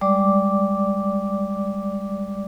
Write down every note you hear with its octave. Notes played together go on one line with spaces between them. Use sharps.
G3 G#3 D5 D6